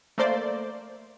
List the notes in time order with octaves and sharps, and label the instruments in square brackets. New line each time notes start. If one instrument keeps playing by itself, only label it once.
[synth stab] A3 A#3 C5 D5